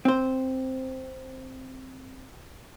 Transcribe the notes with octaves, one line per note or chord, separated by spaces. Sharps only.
C4 C5